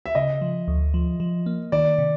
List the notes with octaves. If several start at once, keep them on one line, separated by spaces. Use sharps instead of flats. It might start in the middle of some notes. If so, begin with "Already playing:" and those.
E5
C#3 D#5
F3
D2
F3
F3
A#3
D#3 D5
C3